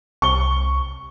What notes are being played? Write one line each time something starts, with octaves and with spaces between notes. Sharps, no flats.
C2 C#6 G7